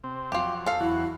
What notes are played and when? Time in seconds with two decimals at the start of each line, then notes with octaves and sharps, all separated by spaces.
0.04 C3 C4
0.32 F2 F#3 F4 G4
0.66 A4 F5
0.80 E2 F#3 E4 F#4